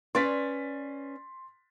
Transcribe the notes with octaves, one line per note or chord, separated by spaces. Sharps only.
C#4 B4 D5 C6 A6 B6